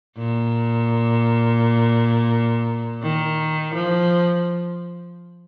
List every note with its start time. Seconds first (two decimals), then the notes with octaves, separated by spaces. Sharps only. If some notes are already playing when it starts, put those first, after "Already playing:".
0.18 A#2
3.03 D#3
3.75 F3